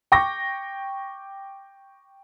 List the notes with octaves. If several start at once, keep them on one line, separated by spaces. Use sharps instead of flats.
G5 C#6 D6 A#6